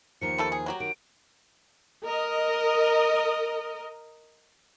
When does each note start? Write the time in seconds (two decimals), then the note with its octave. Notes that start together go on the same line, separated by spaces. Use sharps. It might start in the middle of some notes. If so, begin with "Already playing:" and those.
0.21 D#2 D#3 F3 C#7
0.38 G3 A3 A4
0.52 G#4
0.66 F#3 F#4 G4 A#5
0.80 D#3 D7
2.05 A#4 D#5